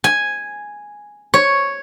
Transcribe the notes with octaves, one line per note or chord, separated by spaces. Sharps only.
G#5
C#5